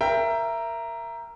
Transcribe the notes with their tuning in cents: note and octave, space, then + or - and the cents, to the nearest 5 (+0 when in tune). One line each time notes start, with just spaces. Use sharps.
A#4 +0 E5 +20 G5 +5